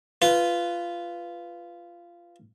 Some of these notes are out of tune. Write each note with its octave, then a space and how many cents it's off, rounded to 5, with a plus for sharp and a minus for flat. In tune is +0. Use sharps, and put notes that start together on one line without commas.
F4 -15 B4 +5